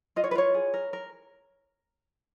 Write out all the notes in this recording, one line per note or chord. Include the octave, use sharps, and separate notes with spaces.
F4 D#5
C#5
B4
F4 C#5
G#4
A#4
A#4